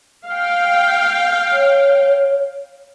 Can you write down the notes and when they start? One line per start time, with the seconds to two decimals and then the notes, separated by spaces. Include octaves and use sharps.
0.27 F5 G5
1.52 C#5